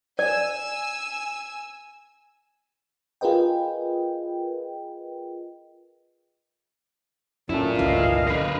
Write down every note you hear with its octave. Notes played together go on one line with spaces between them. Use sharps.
D5 G#5 E6
F4 G#4 A#4 B4 D#5 G5
F#2 A#2 C#4 E4 A4
G1 C#2 E3 D#5 F5
F#2 D3 A#4 B4